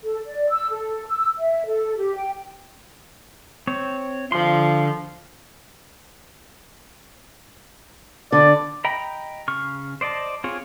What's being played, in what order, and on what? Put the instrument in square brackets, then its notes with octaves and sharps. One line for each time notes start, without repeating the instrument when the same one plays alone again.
[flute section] A4
D5
E6
A4
E6
E5
A4
G4
G5
[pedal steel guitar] C4 C#5
[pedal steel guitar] D3 C6 [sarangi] F3
[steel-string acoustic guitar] D3 [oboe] D5
[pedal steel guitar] D#5 G5 A#5 B5
C#3 C#6 F6
C5 D5 D#5 A5
C4 F4 G#4 C#5